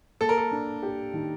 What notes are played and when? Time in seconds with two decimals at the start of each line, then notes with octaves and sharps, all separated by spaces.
0.21 A#3 A4
0.29 A#4
0.38 A4
0.52 D4
0.83 G4
1.14 D#3